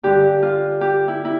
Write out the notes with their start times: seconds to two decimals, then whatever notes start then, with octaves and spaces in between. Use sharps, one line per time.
0.03 G2 D3 G4
0.43 F4
0.81 G4
1.08 E4
1.25 E4